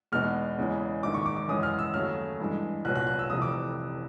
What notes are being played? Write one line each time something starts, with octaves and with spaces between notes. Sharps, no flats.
E2 B2 G#3 B3 D#4 F6
E2 C#3 E3 G#3
A#1 G#2 D#3 D6
C#6
D6
D6
F#2 C#3 E3 G#3 C#4 D#6
F6
E6
D#2 C#3 F#3 A3 F6
G2 E3 G#3
C2 A#2 F#3 B3 F#6
F#6
F#6
E6
F1 F2 C3 E3 D#6
D6